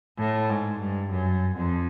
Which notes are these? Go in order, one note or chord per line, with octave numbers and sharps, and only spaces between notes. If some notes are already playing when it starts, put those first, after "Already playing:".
A2
G#2
G2
F#2
F2